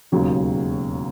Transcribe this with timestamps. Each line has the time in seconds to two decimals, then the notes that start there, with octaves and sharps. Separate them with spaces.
0.12 E1 D#2 C#3 F#3